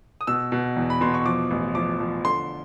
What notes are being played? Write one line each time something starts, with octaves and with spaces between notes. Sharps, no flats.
D#6
B2 E6
B2
E2
B5
B2 C6
C#6
F3 D6
A1
F3 D6
F3
D3 C6